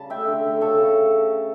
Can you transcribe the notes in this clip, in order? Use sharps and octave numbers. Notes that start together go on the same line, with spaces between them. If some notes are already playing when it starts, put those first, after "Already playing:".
Already playing: C#3 G3 A5
A3 E5 G5
D3
A3
C#3 A4 C#5
C#3